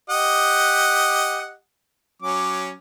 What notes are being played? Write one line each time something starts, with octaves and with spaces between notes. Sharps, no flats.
G4 D#5 F#5
F#3 C#4 D6